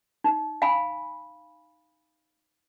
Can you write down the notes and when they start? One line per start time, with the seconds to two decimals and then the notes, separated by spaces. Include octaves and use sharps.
0.24 D#4
0.62 F5 G#5 B5